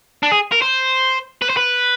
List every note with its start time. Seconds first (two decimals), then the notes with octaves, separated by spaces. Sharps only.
0.23 D4
0.31 G#4
0.52 A#4
0.62 C5
1.42 B4
1.49 C5
1.57 B4